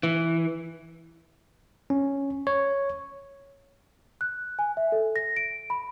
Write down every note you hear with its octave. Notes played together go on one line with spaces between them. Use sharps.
E3
C#4
C#5
F#6
G#5
E5
A4
A#6
D7
B5